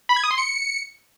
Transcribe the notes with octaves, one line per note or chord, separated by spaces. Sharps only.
B5
G#6
D#6
C6
C#7